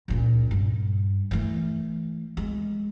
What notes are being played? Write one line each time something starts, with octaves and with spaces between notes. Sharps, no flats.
C#2 A#2
G2
E3 A3
G#3